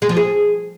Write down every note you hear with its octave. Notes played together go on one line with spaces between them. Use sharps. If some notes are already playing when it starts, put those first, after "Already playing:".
G#3
F3
G#4